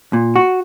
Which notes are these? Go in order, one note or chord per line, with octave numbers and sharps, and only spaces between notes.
A#2
F#4